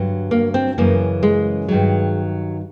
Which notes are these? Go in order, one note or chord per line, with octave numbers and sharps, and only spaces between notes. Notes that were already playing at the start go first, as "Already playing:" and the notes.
Already playing: G2 D3 F#3
A#3
C4
F#2 C#3 E3 A#3
G#3
G2 D#3 F#3